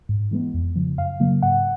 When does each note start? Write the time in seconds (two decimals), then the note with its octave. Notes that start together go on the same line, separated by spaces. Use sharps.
0.09 G#2
0.31 E3 G#3 B3
0.54 F2
0.76 C#3 F3
0.98 F#2 F5
1.20 C#3 F#3 A#3
1.42 G#2 F#5